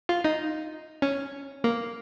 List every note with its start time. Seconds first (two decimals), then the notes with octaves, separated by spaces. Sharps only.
0.09 F4
0.24 D#4
1.02 C#4
1.64 A#3